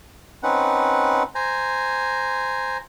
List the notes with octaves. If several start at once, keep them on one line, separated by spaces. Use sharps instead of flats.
C4 C#4 D#4 B4 F#5
C5 G#5 A#5